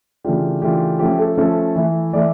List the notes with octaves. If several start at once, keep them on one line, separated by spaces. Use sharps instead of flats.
C#3 E3 A3 D4 F4 G4
C#3 E3 A3 D4 F4 G4
F3 A3 C#4 G4
A4
F3 A3 C#4 A4
E3 A3 E4
E3 A3 E4 D5